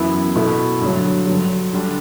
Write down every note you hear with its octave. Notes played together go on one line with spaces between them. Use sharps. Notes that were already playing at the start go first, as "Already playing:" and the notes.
Already playing: F#2 E3 B3 E4
B2 A3 E4
G2 D3 F#3
G2 D3 F#3
D3 G3 D4